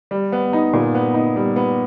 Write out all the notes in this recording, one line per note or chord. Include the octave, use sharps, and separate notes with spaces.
G3
B3
D#4
A#2
B3
D#4
G3
B3